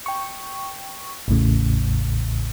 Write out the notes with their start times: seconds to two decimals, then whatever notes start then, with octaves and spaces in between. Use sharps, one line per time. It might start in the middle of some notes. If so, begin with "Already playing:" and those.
0.06 G5 C#6
1.28 A1 E2 A2 C#3